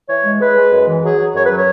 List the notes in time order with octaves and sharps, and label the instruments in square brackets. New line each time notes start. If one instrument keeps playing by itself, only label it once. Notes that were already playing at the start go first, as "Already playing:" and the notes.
[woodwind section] E3 C#5
G#3
G#3 B4
G#3
F#2
E3
F#3 G#4
F#3
F#2 C#5
B4
F#3
C#5